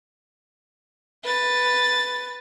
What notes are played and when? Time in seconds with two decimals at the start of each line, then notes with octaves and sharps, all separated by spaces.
1.24 B4 A6